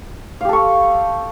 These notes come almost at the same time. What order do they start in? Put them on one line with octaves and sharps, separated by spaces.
F5 G4 A4 C#6